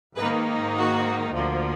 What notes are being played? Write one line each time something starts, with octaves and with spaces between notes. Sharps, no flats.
G#2 D#3 A#3 D#4 G#4 B4
F#4
D2 D3 F3 A#3